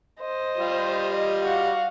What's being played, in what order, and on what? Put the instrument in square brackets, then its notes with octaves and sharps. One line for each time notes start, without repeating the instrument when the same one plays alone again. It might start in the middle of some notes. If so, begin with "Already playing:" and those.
[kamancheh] C5 D#5
[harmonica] G3 F4 G4
[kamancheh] D#5
F#4 F5